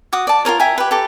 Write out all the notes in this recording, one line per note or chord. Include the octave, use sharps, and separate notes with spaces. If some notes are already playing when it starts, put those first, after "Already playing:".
F#4 D6 D#6
D5 A5
F4 A4 A#4 C#5
E5 G5 G#5 A#5
G4 B4
G4 A4 D6